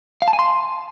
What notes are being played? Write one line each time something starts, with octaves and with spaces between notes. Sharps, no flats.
F5
A5
G#5
C6